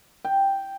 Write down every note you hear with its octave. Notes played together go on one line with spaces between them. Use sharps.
G5